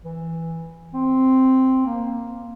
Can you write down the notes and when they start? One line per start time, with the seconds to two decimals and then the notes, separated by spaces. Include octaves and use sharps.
0.03 E3
0.94 C4
1.86 A#3